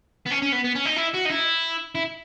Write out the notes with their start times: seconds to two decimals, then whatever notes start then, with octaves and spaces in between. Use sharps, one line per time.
0.26 B3
0.31 C#4
0.42 C#4
0.53 B3
0.64 B3
0.75 C#4
0.85 D#4
0.96 E4
1.14 F#4
1.25 D#4
1.29 E4
1.95 E4